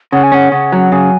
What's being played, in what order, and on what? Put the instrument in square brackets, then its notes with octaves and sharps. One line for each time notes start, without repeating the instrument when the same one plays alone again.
[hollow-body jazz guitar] C#3 [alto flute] F#5
[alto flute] G#5
[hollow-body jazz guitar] C#4 [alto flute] F#5
[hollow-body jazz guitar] C#3 [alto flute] F#5
[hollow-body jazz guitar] F#3
[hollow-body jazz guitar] C#3 [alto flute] G#5